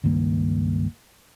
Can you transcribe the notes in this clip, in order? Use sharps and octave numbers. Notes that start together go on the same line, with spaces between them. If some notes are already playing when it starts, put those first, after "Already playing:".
C#2 G2 D#3 A#3